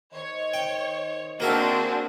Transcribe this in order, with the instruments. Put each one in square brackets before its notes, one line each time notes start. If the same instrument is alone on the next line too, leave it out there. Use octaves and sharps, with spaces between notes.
[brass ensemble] D#3 C5 D#5 [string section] C#5
[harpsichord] G5
[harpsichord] A#3 A#4 E5 [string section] C4 D4 G#4 [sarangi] F#4